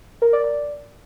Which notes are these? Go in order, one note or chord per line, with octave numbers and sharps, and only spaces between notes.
A#4
D5
D5